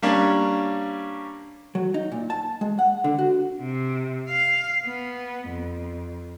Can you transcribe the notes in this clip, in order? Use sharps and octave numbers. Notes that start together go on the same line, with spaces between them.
G3 A#3 C#4 D4 C#5
F#3
D#4
A#2
A5
G#3
F#5
D3
F#4
C3
F5
B3
F2